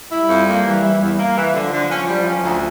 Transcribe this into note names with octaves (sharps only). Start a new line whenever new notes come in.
G3 E4
F2
A#3
E3
E4
E2
A#3
E3
D3 F3
D3
C#4
G3
C#4
D2